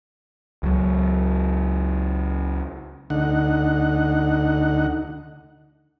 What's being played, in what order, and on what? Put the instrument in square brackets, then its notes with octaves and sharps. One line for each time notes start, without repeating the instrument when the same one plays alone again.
[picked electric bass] C#2 F#3
[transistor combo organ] D2 D3 D#4 F#5